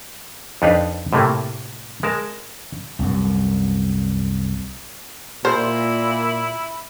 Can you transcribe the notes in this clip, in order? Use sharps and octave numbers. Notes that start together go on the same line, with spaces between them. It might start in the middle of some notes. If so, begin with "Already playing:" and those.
F2 D4 D#4 B4 F5
A2 C3 A3 A#3
G#3 A#4 A5
C2 F#2
A#2 E4 C5